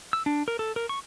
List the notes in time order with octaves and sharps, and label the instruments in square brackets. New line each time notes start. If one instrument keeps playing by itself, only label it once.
[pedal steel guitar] E6
D4
A#4
A4
A#4
C#6